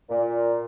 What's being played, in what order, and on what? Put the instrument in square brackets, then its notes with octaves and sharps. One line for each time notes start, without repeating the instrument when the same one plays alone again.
[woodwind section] A#2